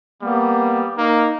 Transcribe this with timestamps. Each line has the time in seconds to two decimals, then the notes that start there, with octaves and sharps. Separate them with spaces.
0.22 G3 A#3 B3
0.97 A#3 D#4